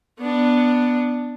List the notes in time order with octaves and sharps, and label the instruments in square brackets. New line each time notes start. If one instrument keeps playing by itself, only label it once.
[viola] B3 D4